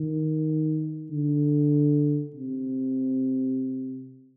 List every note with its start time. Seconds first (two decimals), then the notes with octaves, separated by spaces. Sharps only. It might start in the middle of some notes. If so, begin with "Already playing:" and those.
Already playing: D#3
1.10 D3
2.35 C3